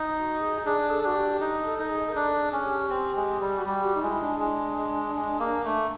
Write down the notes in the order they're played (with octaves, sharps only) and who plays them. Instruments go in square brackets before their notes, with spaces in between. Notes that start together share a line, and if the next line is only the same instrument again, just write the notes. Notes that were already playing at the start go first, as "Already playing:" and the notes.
Already playing: [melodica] D#4
[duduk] F#4
G#4
[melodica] D4 [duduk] G#4
[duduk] A4
[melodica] D4 [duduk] F#4
[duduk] G4
[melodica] D#4
[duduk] A4
[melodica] D#4
[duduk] A4
G#4
A#4
[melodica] D4 [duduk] A4
[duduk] G#4
[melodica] C#4
[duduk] G4
[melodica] C4
G#3
G3
[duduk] F#4
[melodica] G3 [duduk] G4
[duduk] F#4
D#4
[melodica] G#3 [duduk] E4
[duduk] D4
[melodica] G#3
G#3
G#3
A#3
A3